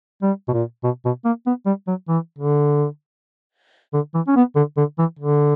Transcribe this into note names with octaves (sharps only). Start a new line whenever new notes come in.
G3
B2
A#2
B2
B2
A#3
B3
G3
F#3
E3
D3
D3
E3
C#4
B3
D3
D3
E3
D3